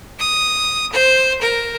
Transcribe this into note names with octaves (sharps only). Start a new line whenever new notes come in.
D#6
C5
A#4